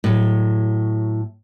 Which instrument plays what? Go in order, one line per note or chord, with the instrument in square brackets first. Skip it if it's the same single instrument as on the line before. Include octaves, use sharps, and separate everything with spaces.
[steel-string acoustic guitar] A2 F#3